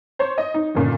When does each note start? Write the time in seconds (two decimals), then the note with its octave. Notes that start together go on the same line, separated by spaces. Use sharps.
0.19 C5 C#5
0.38 D#5
0.54 D#4
0.75 G1 A#2 C#3